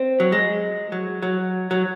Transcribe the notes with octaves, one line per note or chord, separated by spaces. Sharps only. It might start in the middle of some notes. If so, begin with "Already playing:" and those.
Already playing: C4
F#3
G#3
F#3
F#3
F#3